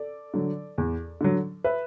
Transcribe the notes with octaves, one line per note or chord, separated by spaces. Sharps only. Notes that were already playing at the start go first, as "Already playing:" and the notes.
Already playing: A4 D5
D3 F#3
E2
D3 F#3
B4 E5